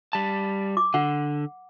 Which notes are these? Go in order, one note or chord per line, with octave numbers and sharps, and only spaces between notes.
G3 A5
D6
D3 F#5